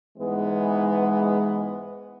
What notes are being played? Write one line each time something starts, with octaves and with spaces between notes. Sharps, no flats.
G#2 E3 G#3 B3